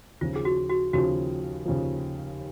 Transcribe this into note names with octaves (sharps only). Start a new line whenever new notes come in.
D#2 C#3 F3 F4
G#4
F#4
F#4
D#2 C#3 F3 F#4
D#2 C#3 F3